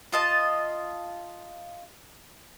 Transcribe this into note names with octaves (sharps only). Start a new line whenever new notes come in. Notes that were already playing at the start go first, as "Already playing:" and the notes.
F4 D#5 A5